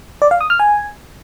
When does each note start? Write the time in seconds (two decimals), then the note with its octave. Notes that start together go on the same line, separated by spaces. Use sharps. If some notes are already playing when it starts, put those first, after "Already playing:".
0.22 D5
0.31 F5
0.41 D#6
0.50 F6
0.60 G#5